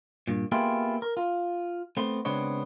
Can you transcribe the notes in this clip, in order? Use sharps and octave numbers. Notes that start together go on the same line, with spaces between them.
G2 A#2
A#3 B3 E4 F4 G4 G#4
A#4
F4
A3 B3 C4
C#3 G#3 B3 C4 D4 C#5